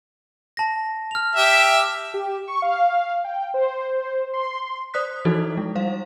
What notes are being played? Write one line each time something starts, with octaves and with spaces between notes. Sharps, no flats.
A5 A#6
F6 F7
G4 E5
G4
C#6
F5
G5
C5
C6
C5 D5 D#6 F#6 B6
E3 F3 D#4 E4 F#4 A4
G#3
G3 C5 F5